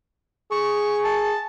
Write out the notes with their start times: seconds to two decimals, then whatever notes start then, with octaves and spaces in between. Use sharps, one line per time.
0.51 G#4 C#6
1.04 A5